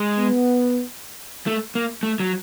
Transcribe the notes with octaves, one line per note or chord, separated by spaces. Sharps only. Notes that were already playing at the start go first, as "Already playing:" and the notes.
Already playing: G#3
B3
A3
A#3
A3
F#3